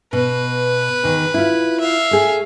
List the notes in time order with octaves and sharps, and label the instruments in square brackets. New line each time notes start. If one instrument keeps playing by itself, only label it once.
[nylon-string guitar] B2 [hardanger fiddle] B4
[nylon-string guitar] E2 D#3
E4 F4
[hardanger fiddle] E5 F5
[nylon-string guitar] A3 G#4